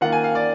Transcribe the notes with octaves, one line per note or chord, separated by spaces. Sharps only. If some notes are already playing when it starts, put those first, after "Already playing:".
D#3 A#3 F4 F#5
G#5
F5
D5